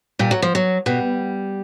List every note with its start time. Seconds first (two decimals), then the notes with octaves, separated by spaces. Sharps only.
0.19 A#2 G3
0.31 F#3
0.42 F3
0.55 F#3
0.86 B2 G3